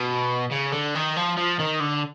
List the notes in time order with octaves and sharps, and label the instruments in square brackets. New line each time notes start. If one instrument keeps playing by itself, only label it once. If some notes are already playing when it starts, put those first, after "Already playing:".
Already playing: [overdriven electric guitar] B2
C#3
D3
D#3
F3
F3
D#3
D3